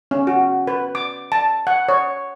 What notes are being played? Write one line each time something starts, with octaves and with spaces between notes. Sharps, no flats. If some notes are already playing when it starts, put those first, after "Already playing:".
C#4
F#4
B4
D6
A5
F#5
C#5